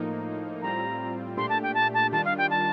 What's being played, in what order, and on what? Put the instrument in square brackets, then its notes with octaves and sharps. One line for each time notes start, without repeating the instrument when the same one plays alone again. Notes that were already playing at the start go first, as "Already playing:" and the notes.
Already playing: [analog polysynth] A2 F3 A#3 D#4
[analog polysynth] A2 G3 C4 F4 [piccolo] A#5
[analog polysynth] A#2 A3 D4 G4 [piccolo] C6
[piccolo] A5
G5
A5
A5
[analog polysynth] D#3 G3 D4 F4 [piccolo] A5
[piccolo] F5
G5
A5